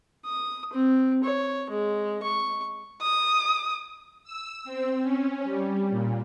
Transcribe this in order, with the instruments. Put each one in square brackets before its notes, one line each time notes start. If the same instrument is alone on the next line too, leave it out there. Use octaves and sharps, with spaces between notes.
[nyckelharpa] D#6
C4
C#5
G#3
C#6
[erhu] D#6
[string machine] E6
C4
C#4
G3
A#2